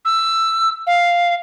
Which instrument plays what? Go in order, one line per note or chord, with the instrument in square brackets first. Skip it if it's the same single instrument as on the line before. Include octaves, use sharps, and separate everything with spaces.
[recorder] E6
F5